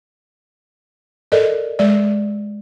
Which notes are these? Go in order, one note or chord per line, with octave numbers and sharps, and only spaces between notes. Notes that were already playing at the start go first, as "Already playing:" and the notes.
A4 A#4 D5 D#5
G#3 D5